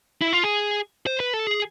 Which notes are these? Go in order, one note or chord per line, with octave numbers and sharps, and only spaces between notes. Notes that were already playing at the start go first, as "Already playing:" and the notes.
E4
F4
G#4
C5
B4
A4
G#4